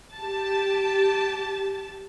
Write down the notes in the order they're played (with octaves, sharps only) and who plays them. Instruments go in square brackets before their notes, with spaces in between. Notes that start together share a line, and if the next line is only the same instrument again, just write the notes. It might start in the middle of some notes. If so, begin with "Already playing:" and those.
[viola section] G4 A5